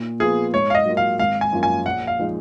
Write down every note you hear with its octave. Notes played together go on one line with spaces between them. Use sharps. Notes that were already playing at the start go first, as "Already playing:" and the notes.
Already playing: A#2
F3 B3 F4 G#4
G#2 C#5
F5
D#5
F#3 A#3 F4
F5
G#1 F5
G#5
F#2 F3 A#3 F4
G#5
A#1 F#5
F5
F3 G#3 D#4